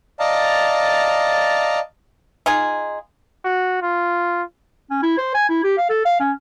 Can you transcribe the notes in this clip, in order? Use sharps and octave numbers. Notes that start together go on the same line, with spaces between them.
D5 D#5 F5 A5 A#5
D#4 F4 G#4
F#4
F4
C#4
E4
C5
G#5
E4
G4
F5
A4
F5
C#4